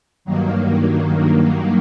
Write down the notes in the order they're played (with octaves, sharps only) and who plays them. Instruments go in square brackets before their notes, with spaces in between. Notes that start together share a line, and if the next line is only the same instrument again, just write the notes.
[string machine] G2 D#3 F#3 A#3